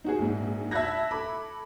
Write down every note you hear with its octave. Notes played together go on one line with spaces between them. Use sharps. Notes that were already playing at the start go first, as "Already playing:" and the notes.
D#4 F#4 G#4
A#1 G#2
E5 A5 B5 F#6 G#6 A#6
A4 B5 D6